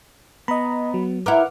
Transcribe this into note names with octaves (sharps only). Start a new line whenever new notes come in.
B3 D#5 A#5 B5
F#3
E4 A#4 B4 F#5 D6 F6